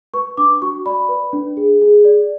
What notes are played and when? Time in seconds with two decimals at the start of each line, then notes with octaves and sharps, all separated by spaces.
0.14 B4 C#6
0.37 D4 D6
0.62 F#4 C#6
0.86 D5 B5
1.09 B4
1.33 D4
1.57 G#4
1.81 G#4
2.05 D5